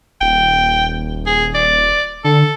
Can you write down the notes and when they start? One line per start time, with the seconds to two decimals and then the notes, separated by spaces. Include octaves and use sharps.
0.21 D#1 G5
1.26 G#4
1.55 D5
2.24 D3 A4